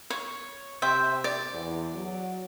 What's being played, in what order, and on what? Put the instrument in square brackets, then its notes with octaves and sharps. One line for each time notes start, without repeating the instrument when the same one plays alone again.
[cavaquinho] C#5
[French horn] C3 [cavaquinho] C5 E5 G5
[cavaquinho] D5
[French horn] E2
F#3